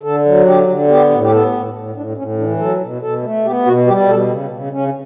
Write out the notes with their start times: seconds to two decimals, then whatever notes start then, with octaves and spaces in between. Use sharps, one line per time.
0.03 D3 A4
0.25 F#3
0.46 D3 G4
0.68 D3
0.88 B3 G4
1.10 A2
1.21 G4
1.31 B3 A4
1.52 A2
1.73 A2
1.95 A2 D4
2.17 A2 C#4
2.38 E3 D4
2.59 F#3 A4
2.81 B2
3.01 B2 A4
3.23 A3
3.45 B3 G4
3.66 B2 F#4
3.87 G3 G4
4.09 B2 A4
4.29 C#3
4.50 C#3
4.72 C#3 C#4